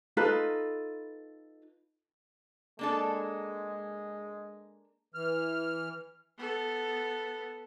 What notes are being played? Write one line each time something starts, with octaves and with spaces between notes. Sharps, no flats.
D#4 F4 A4 B4
G#3 A#3 D4 A4
E3 F6
B3 A4